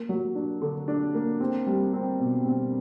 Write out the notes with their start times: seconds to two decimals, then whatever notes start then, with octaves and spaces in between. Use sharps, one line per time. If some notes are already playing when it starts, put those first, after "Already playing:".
Already playing: A#3
0.09 F#3
0.35 D4
0.62 D3
0.88 D4
1.14 A#3
1.40 C4
1.67 G3
1.93 C4
2.19 B2
2.45 C4